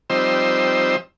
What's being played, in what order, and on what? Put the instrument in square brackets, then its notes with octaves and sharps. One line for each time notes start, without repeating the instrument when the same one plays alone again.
[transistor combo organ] F3 G3 C4 D#4 C5 E6